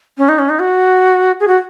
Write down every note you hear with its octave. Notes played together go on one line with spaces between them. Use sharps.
C#4
D#4
C#4
D#4
F#4
G#4
F#4